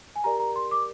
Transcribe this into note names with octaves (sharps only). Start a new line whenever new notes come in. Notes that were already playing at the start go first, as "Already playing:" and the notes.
G#5
G4 A#4 D5 A#5
A#5
C6
D6